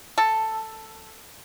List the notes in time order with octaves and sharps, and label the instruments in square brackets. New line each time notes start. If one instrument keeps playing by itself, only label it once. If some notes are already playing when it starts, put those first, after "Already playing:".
[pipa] A4